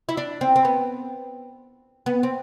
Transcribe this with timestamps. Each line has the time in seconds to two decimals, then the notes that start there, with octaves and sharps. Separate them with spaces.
0.09 E4
0.17 D4
0.41 C4
0.56 C4
0.65 B3
2.06 B3
2.23 C4